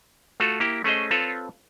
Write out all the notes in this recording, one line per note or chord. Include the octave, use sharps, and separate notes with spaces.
A3 F4 F#4 A4
A#3 E4 G4
A3 C#4 G#4 C5 D#5
C4 F4 A4 B4 C#5